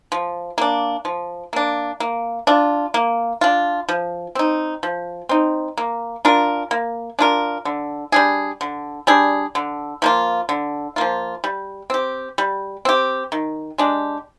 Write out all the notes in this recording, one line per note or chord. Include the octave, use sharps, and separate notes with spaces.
F3
A#3 D4
F3
A#3 D4
A#3
D4 F4
A#3
D4 F4
F3
C4 D#4
F3
C4 D#4
A#3
D4 F4 A#4
A#3
D4 F4 A#4
D3
G3 D4 G#4
D3
G3 D4 G#4
D3
F3 A#3 F4
D3
F3 A#3 F4
G3
C4 G4
G3
C4 G4
D#3
G#3 D4 G4